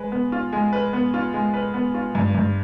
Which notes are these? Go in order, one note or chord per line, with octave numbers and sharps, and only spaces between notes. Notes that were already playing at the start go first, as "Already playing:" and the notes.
Already playing: G#3 B4
B3
F4
G#3
B4
B3
F4
G#3
B4
B3
F4
G2
G2